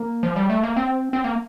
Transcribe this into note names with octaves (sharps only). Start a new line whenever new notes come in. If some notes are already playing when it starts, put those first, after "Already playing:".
Already playing: A#3
F3
G3
A3
A#3
C4
C4
A#3